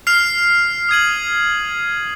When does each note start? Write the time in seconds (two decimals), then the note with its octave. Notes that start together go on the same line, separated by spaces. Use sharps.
0.07 F6 C7 F7
0.89 D#6 G#6 D#7 F#7